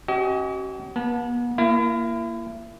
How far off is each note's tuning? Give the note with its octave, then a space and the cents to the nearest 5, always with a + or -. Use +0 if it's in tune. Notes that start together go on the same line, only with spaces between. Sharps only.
C#4 -20 F#4 +45 D#5 +30
B3 -40 A5 -5
A#3 +0 E4 +35